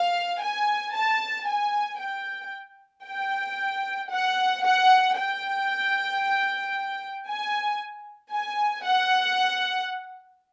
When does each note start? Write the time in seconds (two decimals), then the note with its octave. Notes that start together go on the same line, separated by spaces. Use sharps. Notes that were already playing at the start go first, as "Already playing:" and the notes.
Already playing: F5
0.41 G#5
0.94 A5
1.47 G#5
2.00 G5
3.06 G5
4.11 F#5
4.63 F#5
5.17 G5
7.28 G#5
8.32 G#5
8.85 F#5